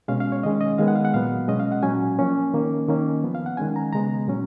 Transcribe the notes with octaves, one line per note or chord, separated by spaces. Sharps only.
B2 G#3 C#4 F5
F5
C#5
D#3 G#3 C#4 D#5
D#5
D#3 G#3 B3 F5
F#5
F5
F#5
A#2 F#3 B3 F5
B2 G#3 C#4 D#5
F5
F#5
A#2 F#3 C#4 G#5
F3 A#3 C#4
D#3 A#3 C#4
D#3 A#3 C#4
F3 B3
F5
F#5
D#3 G#3 C#4 G#5
A#5
C#3 G#3 B3 A#5
A#2 F#3 C#4